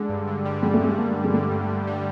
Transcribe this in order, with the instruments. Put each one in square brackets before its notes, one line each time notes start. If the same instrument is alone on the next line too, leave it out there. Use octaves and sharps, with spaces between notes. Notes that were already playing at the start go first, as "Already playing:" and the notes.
Already playing: [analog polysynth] D3 [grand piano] G#3
[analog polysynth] G2
D3
G3
[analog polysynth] D3 [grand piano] G#3
[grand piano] A3
[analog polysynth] G2 [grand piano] G#3
[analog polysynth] G2 [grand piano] A#3
[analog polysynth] G2
[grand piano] G#3
[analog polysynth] D3 [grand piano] A3
[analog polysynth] G2
G2
G3